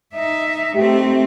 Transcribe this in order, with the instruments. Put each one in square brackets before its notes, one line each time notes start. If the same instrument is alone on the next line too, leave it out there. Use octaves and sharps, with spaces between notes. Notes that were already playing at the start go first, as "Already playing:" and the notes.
[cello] D#4 E5
[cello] A3 C4 [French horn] G4